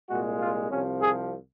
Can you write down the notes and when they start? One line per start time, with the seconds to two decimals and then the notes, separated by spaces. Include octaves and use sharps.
0.09 C2 A#2 G#3 F#4
0.41 F4
0.71 C2 C3 F3 C#4
1.02 G#4